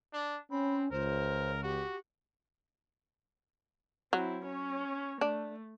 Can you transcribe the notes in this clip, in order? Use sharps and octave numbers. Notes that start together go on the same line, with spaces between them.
D4
C4 C#4 B5
C#2 A#4 C5
F#4 G4
F#3 C4 E4
C#4 C#5
A3 D4